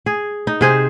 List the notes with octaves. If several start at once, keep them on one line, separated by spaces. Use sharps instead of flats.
G#4
D#4
C3 G#4 C5